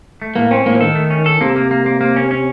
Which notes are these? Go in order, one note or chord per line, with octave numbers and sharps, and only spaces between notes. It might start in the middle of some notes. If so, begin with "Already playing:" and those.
A3
A2 A#3
C4 C#4
A2 A#3
F3
D#3 A4
A3
C#4
A4
C3 A#3
A#3
A#3
A#3
A#3
C#4
C#4